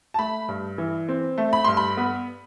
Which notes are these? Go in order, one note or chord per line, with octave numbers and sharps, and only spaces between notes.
A5
A3 B5
G2
E3
C4
A3
B5
G2 C6
B5
B3